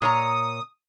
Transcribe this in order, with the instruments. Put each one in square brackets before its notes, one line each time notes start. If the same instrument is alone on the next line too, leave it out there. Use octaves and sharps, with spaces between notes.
[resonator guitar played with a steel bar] A#2 C#5 A#5 [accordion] D#6